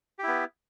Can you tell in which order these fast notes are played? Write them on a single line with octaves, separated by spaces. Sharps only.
G4 E4 B3